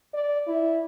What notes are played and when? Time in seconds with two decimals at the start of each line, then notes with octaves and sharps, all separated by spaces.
0.14 D5
0.47 E4